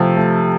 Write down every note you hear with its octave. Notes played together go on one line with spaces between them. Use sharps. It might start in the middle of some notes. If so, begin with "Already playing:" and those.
Already playing: C3 F3 A3
A3